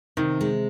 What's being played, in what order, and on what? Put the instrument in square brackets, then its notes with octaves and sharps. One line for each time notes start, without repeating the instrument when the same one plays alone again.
[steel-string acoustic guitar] C3 [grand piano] D#3
[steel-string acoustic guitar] G#3